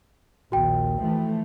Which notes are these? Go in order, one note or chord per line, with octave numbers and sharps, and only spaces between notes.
A#1 D#2 A#2 F#4 G5
E3 F3 A3